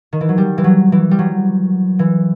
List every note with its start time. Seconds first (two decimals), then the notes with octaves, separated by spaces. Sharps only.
0.13 D#3
0.21 E3
0.29 F#3
0.38 G3
0.58 E3
0.64 F#3
0.92 E3
1.11 G3
1.19 F#3
1.99 E3